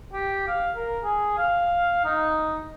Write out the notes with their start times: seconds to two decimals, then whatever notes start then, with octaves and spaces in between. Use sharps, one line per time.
0.13 G4
0.48 F5
0.76 A#4
1.04 G#4
1.38 F5
2.05 D#4